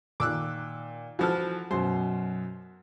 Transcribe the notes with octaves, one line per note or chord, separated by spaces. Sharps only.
A#2 D#3 D6 E6 F#6
E3 F3 F#4 A4 F6
F#2 B2 C5